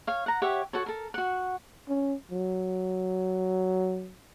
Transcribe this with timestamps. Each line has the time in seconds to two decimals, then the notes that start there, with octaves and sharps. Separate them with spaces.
0.07 C#5 F5
0.26 F#5 A#5
0.42 G4 C#5 E5 F#5
0.73 F#4 A4 C#5
0.86 A4 A#4
1.14 F#4 F#5
1.89 C#4
2.31 F#3